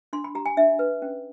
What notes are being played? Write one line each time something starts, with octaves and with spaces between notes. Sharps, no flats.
D4 C6
B5
G4 A#5
G#5
D4 E5
B4
C#4